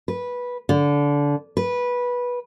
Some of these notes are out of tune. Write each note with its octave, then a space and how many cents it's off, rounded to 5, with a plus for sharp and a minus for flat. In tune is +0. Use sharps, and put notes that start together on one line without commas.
B4 -10
D3 -25
B4 -15